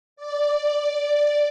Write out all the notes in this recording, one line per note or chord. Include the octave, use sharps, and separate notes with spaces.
D5